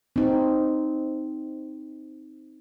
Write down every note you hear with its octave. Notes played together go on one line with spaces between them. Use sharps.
C4 D#4